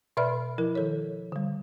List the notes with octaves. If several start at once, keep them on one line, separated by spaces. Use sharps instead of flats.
B2 B4 D5 E5 B5 F6
F3 E4 A#4
D#3 A4 C#5
D3 G3